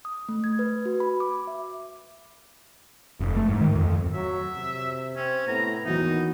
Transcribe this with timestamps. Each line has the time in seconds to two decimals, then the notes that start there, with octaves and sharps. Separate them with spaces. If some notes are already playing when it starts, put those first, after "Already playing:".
0.05 D#6
0.29 A3
0.44 G#6
0.59 B4
0.86 F#4
1.00 B5
1.20 D6
1.47 E5
3.20 F1
3.36 A3
3.49 G#2
3.61 D#3
3.76 F2
4.13 F#3 E5
4.55 C3
5.16 C4 C#4
5.47 A2 B3 A#5
5.85 D#2 D#3 E3 F#3 B3 D#4